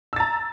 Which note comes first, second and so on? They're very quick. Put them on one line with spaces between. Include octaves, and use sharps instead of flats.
E6 A6 A#5